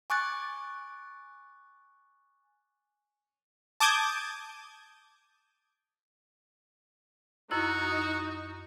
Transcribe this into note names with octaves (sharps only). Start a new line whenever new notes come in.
G#5 C#6 D6 F#6 A6
A5 D6 D#6 G6 G#6
F#2 D#4 E4 F#4 E6